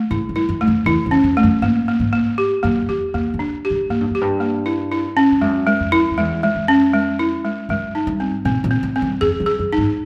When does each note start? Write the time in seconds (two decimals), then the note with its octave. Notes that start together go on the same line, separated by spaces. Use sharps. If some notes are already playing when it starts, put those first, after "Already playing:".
Already playing: A3
0.11 G#2 E4
0.29 G2
0.36 E4
0.49 F#2
0.61 A3
0.68 F2
0.86 E2 E4
1.06 E2
1.11 C#4
1.24 F2
1.37 A3
1.43 F#2
1.62 G#2 A#3
1.88 A#3
2.00 G#2
2.13 A#3
2.38 G4
2.63 F#2 A#3
2.88 F2 G4
3.14 E2 A#3
3.34 F2
3.39 D4
3.65 G4
3.70 G#2
3.89 G#2 A#3
4.01 G2
4.10 F#2 G4
4.21 G2
4.40 A#3
4.66 E4
4.92 E4
5.17 C#4
5.32 G2
5.41 F#2 G#3
5.67 G#3
5.80 F2
5.92 E4
6.11 F2
6.18 E2 G#3
6.43 G#3
6.55 F2
6.68 C#4
6.94 G#3
7.19 E4
7.45 G#3
7.69 F#2 G#3
7.95 D#4
8.07 G2
8.20 C4
8.45 A#2 C4
8.64 A#2
8.71 C4
8.83 A2
8.96 C4
9.02 G2
9.21 F2 G#4
9.40 F#2
9.46 G#4
9.59 F#2
9.73 D#4
9.78 G#2